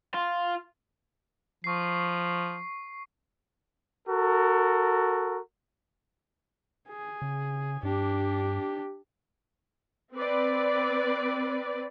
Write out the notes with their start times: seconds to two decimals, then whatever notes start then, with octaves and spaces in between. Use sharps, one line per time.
0.14 F4
1.64 F3 C#6 C7
4.08 F#4 A4 A#4
6.88 G#4
7.22 C#3
7.83 G2 D4 G4
10.15 C4 B4 D5